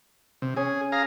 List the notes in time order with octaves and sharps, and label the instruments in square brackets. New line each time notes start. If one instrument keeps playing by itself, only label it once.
[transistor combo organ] C3
[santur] C#4 [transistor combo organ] G#4
[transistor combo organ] G#4 F5 A#5